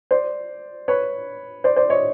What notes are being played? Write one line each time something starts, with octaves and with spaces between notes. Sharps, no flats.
C5 D5
B4 C#5
C5 D5
C5 D5
C#5 D#5